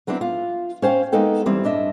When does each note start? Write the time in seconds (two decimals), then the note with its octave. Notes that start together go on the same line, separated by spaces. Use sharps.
0.07 F#3 B3 C4 D4 E4
0.21 F4
0.82 C#4 C5 F5 G5
1.12 G#3 A#3 B3 D#4 A4 G5
1.46 E2 G3 C4 E4
1.64 G2 D4 D#5 E5